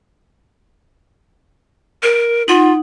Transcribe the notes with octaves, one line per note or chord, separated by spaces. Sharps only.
A#4
D#4 F4 F#5